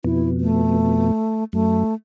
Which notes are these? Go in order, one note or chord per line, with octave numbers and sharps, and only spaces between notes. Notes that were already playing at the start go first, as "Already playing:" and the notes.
F2 B2 E4
A3
F#2 A3